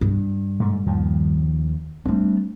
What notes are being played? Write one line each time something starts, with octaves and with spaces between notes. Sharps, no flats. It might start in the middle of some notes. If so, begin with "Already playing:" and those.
G2
G#2 A3
D#2 D#3 F3
G3 A3 C4 D4